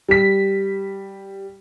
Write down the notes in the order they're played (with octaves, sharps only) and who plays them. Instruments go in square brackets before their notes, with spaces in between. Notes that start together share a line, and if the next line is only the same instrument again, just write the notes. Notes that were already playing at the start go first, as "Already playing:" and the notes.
[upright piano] G3 B6